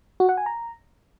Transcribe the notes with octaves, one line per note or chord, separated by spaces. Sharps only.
F#4
F#5
G#5
A#5